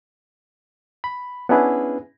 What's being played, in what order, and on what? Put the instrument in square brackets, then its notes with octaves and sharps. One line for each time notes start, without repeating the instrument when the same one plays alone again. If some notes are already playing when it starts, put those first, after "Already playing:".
[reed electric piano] B5
B3 C#4 D4 E4 G#4 B4